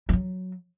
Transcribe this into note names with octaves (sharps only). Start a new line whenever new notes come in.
G3
F#3